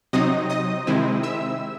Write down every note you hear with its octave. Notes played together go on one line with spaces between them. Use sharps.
C3 F#3 C4 D#4 D#5 D#6
D#5 D#6
C3 D#3 G#3 C4 E4
E5 E6